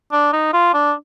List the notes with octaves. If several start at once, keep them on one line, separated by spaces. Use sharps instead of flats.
D4
D#4
F4
D4